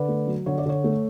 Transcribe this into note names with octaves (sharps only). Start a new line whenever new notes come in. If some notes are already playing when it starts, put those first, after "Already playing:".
Already playing: D3 B4 D5
A3
F#3
D3 C#5
D5
D3 C#5
A3